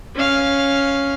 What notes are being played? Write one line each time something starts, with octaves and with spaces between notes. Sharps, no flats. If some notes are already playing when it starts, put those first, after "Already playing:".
C#4 F5